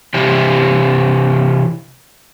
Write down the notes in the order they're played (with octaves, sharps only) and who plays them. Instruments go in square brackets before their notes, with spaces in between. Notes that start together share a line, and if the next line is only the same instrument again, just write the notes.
[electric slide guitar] C3 E3 C4 G4